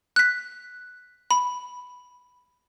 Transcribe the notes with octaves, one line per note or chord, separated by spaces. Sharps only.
F#6 B6
B5